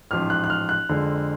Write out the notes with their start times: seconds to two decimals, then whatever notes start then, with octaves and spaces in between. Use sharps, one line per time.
0.11 A1 G#2 F3 F6
0.30 F#6
0.44 F#6
0.50 F6
0.69 F#6
0.89 F2 D3 F3 G#3